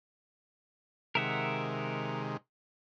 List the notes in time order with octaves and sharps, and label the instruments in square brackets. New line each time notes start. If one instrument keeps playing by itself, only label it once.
[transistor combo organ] C3 D#3 G#3 [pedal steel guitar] A#4 E5 F#5